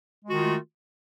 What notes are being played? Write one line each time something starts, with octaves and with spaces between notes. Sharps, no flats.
D#3 G#3 A3 F4 F#4